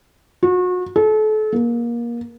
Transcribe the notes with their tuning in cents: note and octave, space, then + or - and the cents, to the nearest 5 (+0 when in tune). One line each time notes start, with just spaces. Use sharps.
F#4 -35
A4 -35
A#3 +25